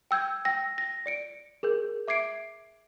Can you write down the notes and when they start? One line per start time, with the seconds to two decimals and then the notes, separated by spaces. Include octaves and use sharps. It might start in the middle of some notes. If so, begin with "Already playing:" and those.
0.11 G5 E6 G6 G#6
0.45 G5 E6 A#6
0.78 A#6
1.06 D5 C#7 D7
1.63 G#4 A#4 G6
2.08 E5 D6 G#6 C7 D7